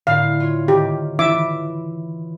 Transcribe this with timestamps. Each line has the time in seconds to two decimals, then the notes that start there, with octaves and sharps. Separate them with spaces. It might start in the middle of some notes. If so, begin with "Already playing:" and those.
0.07 A2 D3 F5
0.40 F4 C#5
0.68 D#3 G4
1.19 E3 E4 E5 D6